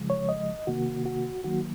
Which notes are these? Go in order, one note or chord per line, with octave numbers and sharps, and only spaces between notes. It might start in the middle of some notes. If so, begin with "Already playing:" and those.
Already playing: C#3 F3 G#3
C#5
D#5
C3 D#3 A#3 F#4
F#4
D#3 F#3 A#3 F#4